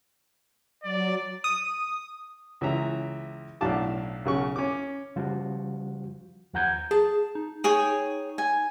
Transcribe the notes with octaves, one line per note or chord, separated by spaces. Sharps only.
F#3 D5
D#6
C#2 E3 E4 E5 A#5
B1 A2 D4 F5 A5 D6
B1 C#3 C#6
C#4 D6
C#3 F3 G3 F4 F#4
D#2 F3 F#5 A#5 G6 G#6
G#4 A5
D#4
G#4 C#5 G5
G#5